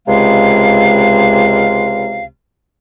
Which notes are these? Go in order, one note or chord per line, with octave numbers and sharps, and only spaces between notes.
C#2 C3 G#3 F5